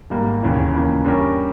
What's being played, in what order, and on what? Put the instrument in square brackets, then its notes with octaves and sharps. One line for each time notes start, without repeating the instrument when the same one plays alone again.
[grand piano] G#1 G#2 G3 A#3
E1 D#2 C#3 E3
C#2 C#3 E3 A#3
G2 G3 C#4 G4 A#4